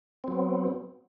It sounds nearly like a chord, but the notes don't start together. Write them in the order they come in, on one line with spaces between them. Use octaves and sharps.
C4 F#3 B3